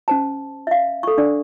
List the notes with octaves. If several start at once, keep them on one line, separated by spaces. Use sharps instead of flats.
C#4 C5 A5
E5 F5
A4 C#6
D4 D5